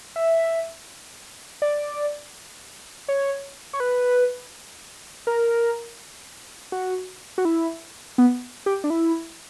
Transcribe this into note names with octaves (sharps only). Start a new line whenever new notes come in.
E5
D5
C#5
C#5
B4
A#4
F#4
F#4
E4
B3
G4
D4
E4